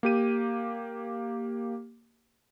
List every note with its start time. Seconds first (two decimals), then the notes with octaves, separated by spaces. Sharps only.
0.03 A#3 G4 D#7